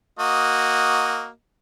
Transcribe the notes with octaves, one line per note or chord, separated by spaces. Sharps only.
A#3 F#4 D#5